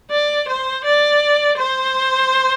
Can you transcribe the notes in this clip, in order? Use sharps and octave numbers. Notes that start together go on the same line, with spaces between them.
D5
C5
D5
C5